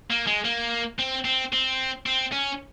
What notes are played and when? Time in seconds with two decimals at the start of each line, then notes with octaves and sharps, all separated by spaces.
0.10 A#3
0.27 G#3
0.45 A#3
0.99 C4
1.25 C4
1.53 C4
2.06 C4
2.32 C#4